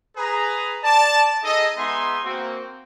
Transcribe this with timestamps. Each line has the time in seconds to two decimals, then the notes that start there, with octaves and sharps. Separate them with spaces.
0.17 G#4 B4 A#5
0.84 D5 A5
1.44 D#4 G#4 A4 D#5
1.78 G#3 B3 D#4 E5 G#5 C6
2.24 A#3 C4 F#4